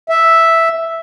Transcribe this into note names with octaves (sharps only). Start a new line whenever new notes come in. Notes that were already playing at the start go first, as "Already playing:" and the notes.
E5